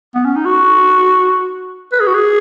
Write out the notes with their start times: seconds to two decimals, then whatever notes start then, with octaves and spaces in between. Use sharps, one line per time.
0.15 B3
0.25 C#4
0.36 D#4
0.46 F#4
1.92 B4
2.00 G#4
2.07 F#4
2.15 G#4